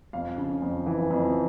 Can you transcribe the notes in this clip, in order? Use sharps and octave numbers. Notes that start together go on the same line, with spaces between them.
F2 F5
C#3
F2
E3
F2